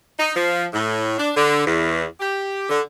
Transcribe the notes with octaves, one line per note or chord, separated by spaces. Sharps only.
D#4
F3
A2
D4
D3
E2
G4
D3